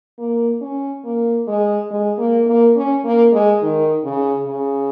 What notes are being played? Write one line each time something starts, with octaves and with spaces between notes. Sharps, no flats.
A#3
C#4
A#3
G#3
G#3
A#3
A#3
C#4
A#3
G#3
D#3
C#3
C#3